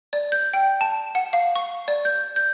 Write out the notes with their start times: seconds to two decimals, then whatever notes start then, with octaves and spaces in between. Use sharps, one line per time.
0.13 D5
0.32 G6
0.53 G5
0.81 A5
1.15 F#5
1.33 F5
1.55 C#6
1.88 D5
2.05 G6
2.36 G6